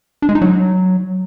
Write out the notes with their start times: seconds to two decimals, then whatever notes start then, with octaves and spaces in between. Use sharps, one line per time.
0.22 D4
0.29 G#3
0.35 D#4
0.42 F#3